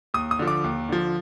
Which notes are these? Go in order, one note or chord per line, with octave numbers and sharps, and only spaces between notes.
D#2 D#6
D#6
D3 F3
D6
D#2
D3 F3